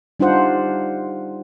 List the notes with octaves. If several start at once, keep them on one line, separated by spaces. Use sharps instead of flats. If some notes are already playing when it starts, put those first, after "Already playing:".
G3 D4 D#4 F4 C5 F#5